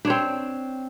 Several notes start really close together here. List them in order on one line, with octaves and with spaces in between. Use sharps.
D4 C#5 C4